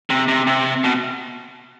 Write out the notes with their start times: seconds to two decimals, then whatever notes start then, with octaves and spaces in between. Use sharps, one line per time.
0.10 C3
0.28 C3
0.47 C3
0.84 B2